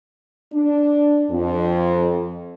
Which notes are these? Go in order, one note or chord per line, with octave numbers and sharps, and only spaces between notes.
D4
F2